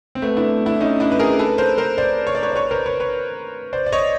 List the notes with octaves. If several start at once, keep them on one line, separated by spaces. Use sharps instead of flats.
C4
A3 B3
D4 E4
D4 E4
C#4 D#4
D4 E4
B4
G#4 A#4
A4 B4
A#4 C5
A#4 C5
C5 D5
C#5
D5
B4 C#5
D5
B4 C#5
A#4 C5
B4 C#5
B4 C#5
C5 D5
D5
C#5 D#5